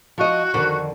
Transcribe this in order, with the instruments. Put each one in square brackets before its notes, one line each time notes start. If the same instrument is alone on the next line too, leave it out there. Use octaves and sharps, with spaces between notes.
[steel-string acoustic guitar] F3 D#5 [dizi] F#4
[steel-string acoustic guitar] F2 D3 D#3